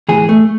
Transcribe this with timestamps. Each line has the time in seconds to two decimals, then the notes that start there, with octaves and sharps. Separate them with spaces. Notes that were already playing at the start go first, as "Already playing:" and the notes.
0.09 A2 E3 G#4
0.29 A3